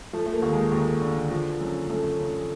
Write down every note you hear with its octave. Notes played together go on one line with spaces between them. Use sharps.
F3 A3
A3
A#3
D#2
G#3
D#2
D3
F3
F#2
F#2 A3
C#3